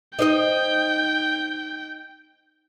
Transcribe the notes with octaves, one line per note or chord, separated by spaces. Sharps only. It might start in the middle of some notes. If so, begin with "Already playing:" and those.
D#4 C5 D#5 G5